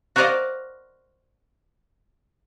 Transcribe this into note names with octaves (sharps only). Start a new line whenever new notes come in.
F#4 A#4 C5 D5 D#5 F5